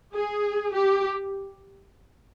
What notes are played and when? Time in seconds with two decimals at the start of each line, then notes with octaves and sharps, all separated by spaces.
0.14 G#4
0.74 G4